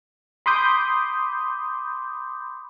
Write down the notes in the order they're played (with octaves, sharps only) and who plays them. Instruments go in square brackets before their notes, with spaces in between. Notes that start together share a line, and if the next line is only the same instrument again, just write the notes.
[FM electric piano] B5 C6 D6 D#6 G6